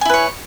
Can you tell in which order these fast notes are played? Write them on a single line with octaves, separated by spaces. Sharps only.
G#5 E4 B4 C#5